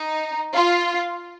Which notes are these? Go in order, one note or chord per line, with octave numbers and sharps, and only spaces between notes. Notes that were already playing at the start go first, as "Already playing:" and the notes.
Already playing: D#4
F4